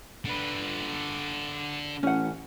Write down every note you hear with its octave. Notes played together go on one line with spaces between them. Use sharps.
D3 B4
A1 C#4 F#5